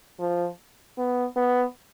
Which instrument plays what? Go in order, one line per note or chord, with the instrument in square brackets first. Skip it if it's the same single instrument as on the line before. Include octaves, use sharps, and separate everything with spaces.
[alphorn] F3
B3
B3